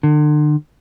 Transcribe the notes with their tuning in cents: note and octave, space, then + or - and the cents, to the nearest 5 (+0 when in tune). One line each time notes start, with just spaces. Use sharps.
D3 +40